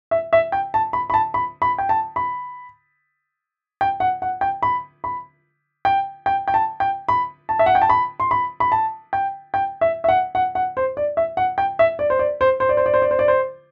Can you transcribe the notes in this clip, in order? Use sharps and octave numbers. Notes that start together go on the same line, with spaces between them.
E5
E5
G5
A5
B5
B5
A5
B5
B5
G5
A5
B5
G5
F#5
F#5
G5
B5
B5
G5
G5
G5
A5
G5
B5
A5
E5
F#5
G5
A5
B5
C6
B5
B5
A5
G5
G5
E5
E5
F#5
F#5
F#5
C5
D5
E5
F#5
G5
E5
D5
C5
D5
C5
C5
D5
C5
D5
C5
D5
C5
D5
C5